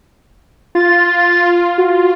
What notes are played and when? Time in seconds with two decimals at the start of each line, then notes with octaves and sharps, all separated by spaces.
0.75 F4 A6
1.78 F#4